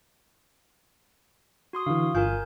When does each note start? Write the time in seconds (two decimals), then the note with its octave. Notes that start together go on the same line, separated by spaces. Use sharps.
1.73 F#4 C6 D#6
1.86 D3 E3 F5
2.15 G1 F4 A#4 F5 G#5 G6